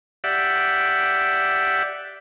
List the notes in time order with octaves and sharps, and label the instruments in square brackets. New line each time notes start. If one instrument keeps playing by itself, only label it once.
[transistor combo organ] G4 D5 E5 F#5